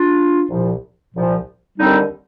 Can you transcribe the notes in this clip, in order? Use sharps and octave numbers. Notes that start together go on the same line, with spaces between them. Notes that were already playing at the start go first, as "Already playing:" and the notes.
Already playing: D4 F4
C2 A#2 F3
C2 A#2 F3
D#2 D3 G3 C4 D#4